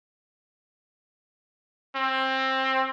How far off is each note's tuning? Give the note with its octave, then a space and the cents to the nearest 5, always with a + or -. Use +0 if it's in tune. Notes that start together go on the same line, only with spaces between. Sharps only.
C4 +20